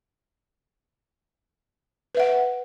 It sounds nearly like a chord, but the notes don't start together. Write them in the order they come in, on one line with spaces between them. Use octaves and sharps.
B4 E5 F#5